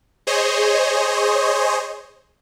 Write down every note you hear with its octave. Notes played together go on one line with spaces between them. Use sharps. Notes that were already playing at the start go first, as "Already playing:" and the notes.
G#4 C5 C#5 D#5